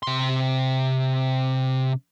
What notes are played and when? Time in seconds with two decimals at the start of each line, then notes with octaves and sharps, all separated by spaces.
0.03 C3 C6